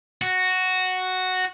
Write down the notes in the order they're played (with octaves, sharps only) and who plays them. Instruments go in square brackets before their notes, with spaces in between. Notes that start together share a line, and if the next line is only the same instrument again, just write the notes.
[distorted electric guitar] F#4